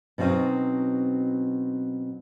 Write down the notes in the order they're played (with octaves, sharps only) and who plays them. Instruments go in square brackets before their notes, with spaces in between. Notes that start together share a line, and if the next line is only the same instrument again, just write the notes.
[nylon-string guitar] B2 F#3 C4 C#4 D#4